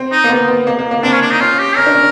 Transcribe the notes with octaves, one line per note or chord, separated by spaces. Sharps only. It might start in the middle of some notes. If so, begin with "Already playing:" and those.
Already playing: C4
D#4
A#3
B3
B3
A#3
A#3
A#3
C4 D4
C#4
D4
D#4
C#4 F4
G4
C#4 A#4
D4
C#4